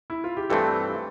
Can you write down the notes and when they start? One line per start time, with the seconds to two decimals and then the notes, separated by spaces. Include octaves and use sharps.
0.10 E4
0.24 F4
0.37 G4
0.50 G2 E3 A3 C4 A4